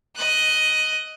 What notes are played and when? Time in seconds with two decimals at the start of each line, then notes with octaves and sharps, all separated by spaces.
0.16 D#5 F#6